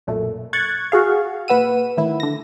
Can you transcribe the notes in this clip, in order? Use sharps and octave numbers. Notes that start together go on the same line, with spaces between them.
B1 F#2 A#2 A3
C#6 F#6 G#6 A6
F#4 G#4 F5
A#2 B4 F#5 E6 D#7
A2 D#3 E4
D3 A#6